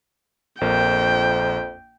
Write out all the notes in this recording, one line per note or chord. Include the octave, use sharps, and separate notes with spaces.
A#1 F2 A#3 G5